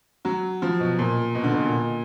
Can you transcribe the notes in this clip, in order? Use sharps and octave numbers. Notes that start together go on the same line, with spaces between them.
F#3
F3
B2
A#2
B2
D3
B2
A#2